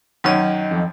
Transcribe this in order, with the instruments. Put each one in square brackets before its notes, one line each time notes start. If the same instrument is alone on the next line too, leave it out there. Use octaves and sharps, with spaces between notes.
[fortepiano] F#2 D#3 C#5 [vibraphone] F#3 D#5
[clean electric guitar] F2